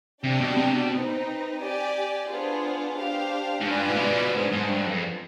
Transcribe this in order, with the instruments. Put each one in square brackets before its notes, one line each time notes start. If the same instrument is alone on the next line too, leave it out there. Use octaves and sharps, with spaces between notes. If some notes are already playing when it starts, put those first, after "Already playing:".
[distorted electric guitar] C3 [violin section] D4 G4 D5 G5
[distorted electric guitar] B2
C3
B2
[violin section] C4 D#4 B4
G4 D5 G#5
B3 D4 F4 G#4 C5
D4 G4 C5 F5
[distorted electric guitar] G#2
[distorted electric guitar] G2 [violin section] F4 B4 D5 G#5
[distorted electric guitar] G#2
B2
G#2
B2
[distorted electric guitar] G#2 [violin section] B3 D4 G#4 C5
[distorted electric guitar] G#2
G2
F2